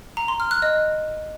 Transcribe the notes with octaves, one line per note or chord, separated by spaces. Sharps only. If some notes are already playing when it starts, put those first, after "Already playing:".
A#5
C6
F6
F#6
D#5